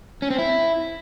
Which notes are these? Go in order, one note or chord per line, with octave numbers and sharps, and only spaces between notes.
C#4
C4
E4